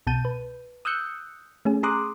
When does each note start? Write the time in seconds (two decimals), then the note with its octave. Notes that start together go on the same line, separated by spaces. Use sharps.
0.07 C2 B2 A5 G6 D#7
0.25 B4
0.85 D#6 E6 F#6 G6 C#7
1.65 A3 C#4 G#4
1.83 G#4 A#5 C6 D6 D#6 F#6